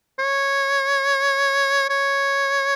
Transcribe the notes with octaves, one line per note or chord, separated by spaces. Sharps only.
C#5
C#5